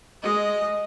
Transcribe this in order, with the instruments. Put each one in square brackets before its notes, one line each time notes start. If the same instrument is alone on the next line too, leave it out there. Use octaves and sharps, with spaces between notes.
[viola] G#3 D#5